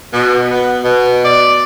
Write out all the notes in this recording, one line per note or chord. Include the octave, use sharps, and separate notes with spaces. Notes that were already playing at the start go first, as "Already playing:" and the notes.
B2
B3
B2
D5